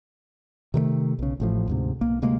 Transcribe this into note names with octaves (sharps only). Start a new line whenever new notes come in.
C3 D#3 G#3 A3
B1 C#3
A1 A2 F3
D2 G#2 C3
B1 A#3
D2 C3 G#3 A#3